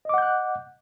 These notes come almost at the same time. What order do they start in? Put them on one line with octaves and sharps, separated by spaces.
D#5 D6 F#5 G6 F#6